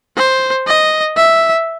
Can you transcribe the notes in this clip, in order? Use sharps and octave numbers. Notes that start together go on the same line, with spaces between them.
C5
D#5
E5